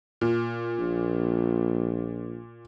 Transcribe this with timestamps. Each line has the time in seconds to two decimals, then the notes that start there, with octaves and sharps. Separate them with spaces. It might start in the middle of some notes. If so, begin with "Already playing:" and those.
0.21 A#2
0.79 A#1